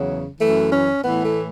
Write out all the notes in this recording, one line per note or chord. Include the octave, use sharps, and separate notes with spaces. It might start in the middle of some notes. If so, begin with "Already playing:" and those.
Already playing: E2 C#3 F#3
F#2 E3 A3
C#4
A2 E3 B3
A3